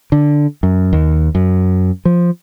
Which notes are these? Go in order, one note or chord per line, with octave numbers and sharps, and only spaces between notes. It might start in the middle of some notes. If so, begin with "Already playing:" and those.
D3
F#2
D#2
F#2
F3